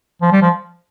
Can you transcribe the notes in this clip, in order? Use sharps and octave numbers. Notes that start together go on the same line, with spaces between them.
F3
G3
F3